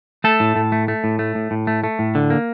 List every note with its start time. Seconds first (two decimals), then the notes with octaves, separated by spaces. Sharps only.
0.24 A3 A4
0.40 A2
0.56 A2
0.72 A3
0.88 A3
1.04 A2
1.19 A3
1.35 A2
1.51 A2
1.67 A3
1.84 A3
1.99 A2
2.15 D3
2.30 A#3